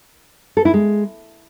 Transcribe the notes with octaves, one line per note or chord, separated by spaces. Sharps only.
A4
E4
G#3